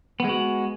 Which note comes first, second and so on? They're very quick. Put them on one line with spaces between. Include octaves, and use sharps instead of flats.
B3 G#3 F#4